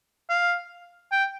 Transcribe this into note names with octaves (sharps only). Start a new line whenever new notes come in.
F5
G5